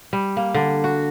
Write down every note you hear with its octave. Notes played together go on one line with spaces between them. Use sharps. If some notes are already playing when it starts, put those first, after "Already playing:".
G3
A#3
D3
F#4